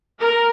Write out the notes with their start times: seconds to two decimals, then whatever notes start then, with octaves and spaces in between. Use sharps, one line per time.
0.18 A#4